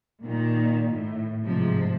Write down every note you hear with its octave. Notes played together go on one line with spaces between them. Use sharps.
A#2 D#3
A2
G#2 C3 F3